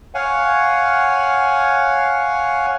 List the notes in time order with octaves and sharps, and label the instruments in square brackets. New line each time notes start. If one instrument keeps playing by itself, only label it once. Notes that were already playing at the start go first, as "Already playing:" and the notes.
[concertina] C#5 F5 F#5 G#5